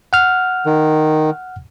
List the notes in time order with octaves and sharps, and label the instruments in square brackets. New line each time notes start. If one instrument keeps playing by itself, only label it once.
[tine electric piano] F#5 F6
[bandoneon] D#3